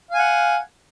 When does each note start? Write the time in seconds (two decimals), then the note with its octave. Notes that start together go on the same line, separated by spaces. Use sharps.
0.11 F5
0.14 G#5
0.18 F#5